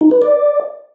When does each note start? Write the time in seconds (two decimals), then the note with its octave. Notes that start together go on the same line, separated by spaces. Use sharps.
0.01 D#4
0.11 B4
0.22 D5